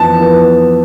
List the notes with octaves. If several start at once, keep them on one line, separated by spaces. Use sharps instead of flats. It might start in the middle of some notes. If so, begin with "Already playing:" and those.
Already playing: F2 E3 B3 A5
F2 E3 B3